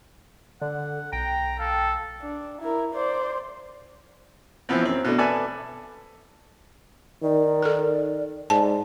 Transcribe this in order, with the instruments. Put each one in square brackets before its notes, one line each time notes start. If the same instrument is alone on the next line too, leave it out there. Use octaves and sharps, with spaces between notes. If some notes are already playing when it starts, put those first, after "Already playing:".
[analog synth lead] D3 [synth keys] D5 [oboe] F#5
[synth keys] B1 [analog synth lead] G5 [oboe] A#5
[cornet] A4 [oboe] F5
[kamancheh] D4
E4 A#4
C5 D5
[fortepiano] E3 F3 B3 C4
F#2 C4
B2 A3 D4
A4 B4 D5 E5 G#5 A5
[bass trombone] D#3 [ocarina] D5
[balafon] A4 A#4
[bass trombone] G#2 [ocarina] D5 [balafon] A5